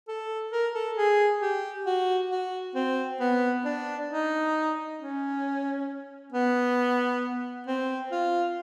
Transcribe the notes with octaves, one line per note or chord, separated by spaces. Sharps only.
A4
A#4
A4
G#4
G4
F#4
F#4
C4
B3
D4
D#4
C#4
B3
C4
F4